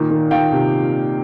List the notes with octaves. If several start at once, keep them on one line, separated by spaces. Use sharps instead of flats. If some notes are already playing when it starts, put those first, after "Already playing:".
Already playing: A#2 D#3
D#3
D#3 F5 G5
C3